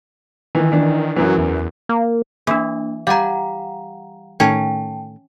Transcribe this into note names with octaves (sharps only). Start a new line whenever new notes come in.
D#3 E3
E3 D4
F#2 E3 F#3
E2
A#3
E3 A#3 D4
G3 F5 F#5 G#5 A#5
A2 D#3 A3 C#4 G5 A5